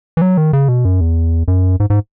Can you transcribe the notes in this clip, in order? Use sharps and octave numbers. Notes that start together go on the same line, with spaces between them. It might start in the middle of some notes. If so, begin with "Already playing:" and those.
E3
F#3
D#3
C#3
B2
F#2
E2
F#2
G#2
G#2